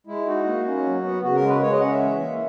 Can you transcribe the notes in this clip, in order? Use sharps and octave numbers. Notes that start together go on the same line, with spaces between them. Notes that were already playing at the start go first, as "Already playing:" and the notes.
G#3 E4
D#4 F#4
A#3
C#4
F#3
B3
C#3 F#4
A#4
G#3
B4
G#3 C#5
D#5
C#4 F#5
E5
E3
A#3